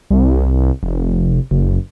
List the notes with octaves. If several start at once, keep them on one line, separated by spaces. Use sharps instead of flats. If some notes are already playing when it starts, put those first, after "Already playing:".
C2
F1
F#1